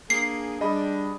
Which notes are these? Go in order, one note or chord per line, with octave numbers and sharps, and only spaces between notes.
A#3 D4 G#4 C7
G3 D4 G#4 D#5 B5